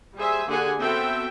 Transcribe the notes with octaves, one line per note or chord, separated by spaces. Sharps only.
G3 G#4 C5 E5 G#5
D3 A#3 G4 G#4 F#5 G#5
B3 C4 F#4 A4 E5 G5